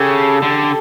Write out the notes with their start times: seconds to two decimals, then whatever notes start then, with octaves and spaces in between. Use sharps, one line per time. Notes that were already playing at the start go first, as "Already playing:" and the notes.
Already playing: C#3 G4 A4
0.42 D3